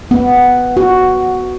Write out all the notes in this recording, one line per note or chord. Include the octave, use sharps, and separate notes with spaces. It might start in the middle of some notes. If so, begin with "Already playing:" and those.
B3
F#4